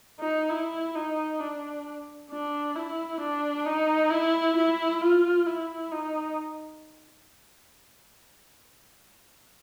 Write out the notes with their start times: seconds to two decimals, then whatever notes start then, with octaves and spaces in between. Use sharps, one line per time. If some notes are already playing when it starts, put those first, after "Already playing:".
0.20 D#4
0.49 E4
0.95 D#4
1.40 D4
2.30 D4
2.75 E4
3.21 D4
3.66 D#4
4.10 E4
4.56 E4
5.01 F4
5.46 E4
5.91 D#4